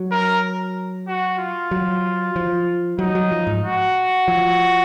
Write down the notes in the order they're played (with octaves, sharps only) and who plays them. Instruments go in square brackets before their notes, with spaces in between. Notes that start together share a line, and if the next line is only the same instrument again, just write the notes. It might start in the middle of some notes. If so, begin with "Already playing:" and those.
Already playing: [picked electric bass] F#3
[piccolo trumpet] A#4
F#4
F4
[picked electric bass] F#3
F3
[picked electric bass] F#3 [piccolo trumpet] D#4
[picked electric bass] F#3
F3
G#2
[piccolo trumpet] F#4
[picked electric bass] F3